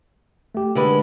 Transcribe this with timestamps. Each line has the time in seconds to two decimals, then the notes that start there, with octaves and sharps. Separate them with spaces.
0.55 A3 G4
0.75 D3 G#3 B4